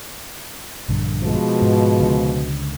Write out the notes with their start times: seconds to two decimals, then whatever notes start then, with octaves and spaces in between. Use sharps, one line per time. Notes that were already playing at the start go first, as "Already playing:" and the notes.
0.88 A#1 G2 D3
1.23 B2 F3 G#3
1.62 G#2
2.00 C#2 D3